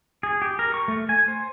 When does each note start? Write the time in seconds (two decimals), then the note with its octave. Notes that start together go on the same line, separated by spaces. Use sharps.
0.23 G#4
0.42 G4
0.59 A#4
0.74 C#6
0.88 A3
1.09 G#5
1.28 C5